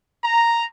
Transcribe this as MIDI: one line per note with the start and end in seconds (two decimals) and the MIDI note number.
0.22 0.65 82